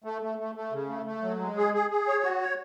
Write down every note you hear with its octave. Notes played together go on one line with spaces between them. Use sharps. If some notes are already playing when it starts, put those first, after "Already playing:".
A3
A3
A3
A3
C#3
A3
A3
F#3
G#3
G#4
G#4
G#4
C#5
F#4
C#5